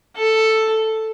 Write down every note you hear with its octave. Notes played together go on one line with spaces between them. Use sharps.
A4